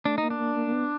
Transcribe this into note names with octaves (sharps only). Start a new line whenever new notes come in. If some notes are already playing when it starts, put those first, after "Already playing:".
A3 D4
A#3 D#4
D4
A#3
A#3
A#3
B3